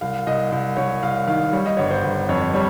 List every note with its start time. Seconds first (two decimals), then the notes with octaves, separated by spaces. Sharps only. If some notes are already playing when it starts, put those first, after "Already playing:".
0.01 C2 F5
0.27 C2 D#5
0.52 C2
0.77 C2 C#5
1.03 C2 F5
1.27 D#3 F5
1.53 G3 C#5
1.66 D#5
1.77 G1 C#5
1.91 C5
2.04 G1
2.29 F2 C#5
2.54 G3 C#5